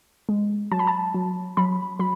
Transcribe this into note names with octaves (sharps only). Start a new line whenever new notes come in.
G#3
F#3 A5
B5
A5
F#3
F#3 B5
F#3 B5